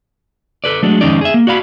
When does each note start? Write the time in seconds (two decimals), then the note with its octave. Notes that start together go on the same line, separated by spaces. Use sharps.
0.64 A4 B4 D5
0.83 F#3 G#3 A3 D4
1.01 F2 D#3 G#3 C#4 D#4 D5
1.21 G#4 E5
1.34 A#3
1.47 F#4 D5 F5 B5